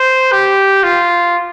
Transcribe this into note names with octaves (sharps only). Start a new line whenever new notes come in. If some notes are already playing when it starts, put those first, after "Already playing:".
Already playing: C5
G4
F4